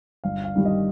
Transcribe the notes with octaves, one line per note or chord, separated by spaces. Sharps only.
G1 F5
F5
G2 D#3 G3
D#5